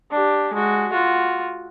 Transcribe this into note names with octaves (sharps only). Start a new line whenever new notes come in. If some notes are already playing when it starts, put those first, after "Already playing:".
D4 G4
G#3 F#4
F4 F#4